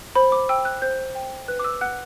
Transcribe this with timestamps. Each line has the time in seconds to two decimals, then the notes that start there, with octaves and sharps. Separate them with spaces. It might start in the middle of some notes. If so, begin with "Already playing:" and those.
0.15 C5 B5
0.32 D6
0.49 G5 E6
0.65 F#6
0.82 C5 G6
1.15 G5
1.48 B4 F#6
1.60 D6
1.64 E6
1.81 F#5 F#6